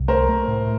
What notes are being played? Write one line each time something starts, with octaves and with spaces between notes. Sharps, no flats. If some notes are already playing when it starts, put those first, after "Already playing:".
Already playing: C2
A3 A#4 C5
A3
A2